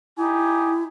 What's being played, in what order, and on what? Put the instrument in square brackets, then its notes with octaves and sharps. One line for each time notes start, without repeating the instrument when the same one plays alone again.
[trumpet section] D#4 G4 G#5 [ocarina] E4